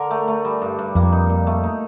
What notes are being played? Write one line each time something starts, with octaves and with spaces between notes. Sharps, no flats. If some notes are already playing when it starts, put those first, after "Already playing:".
Already playing: D3 A#4
A3
A3
G3
G2
G2
F2 A#3
D#4
A#2
A3
D#4